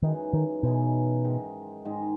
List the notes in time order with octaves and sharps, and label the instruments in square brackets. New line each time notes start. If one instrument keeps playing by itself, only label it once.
[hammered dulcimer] F#2 E3 G#3 D#4 [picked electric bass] D#3
[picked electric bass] D#3
[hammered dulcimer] F#2 E3 G#3 D#4 [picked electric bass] B2
[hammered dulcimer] G#2 D#3 G#3
G#2 D#3 G#3